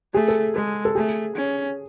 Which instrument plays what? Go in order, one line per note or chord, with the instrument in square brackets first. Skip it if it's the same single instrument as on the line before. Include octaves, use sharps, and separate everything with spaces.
[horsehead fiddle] A3 [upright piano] G#4
[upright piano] A4
[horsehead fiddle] G#3 [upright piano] A4
[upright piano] A4
[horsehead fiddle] A3 [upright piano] G#4
[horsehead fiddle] C#4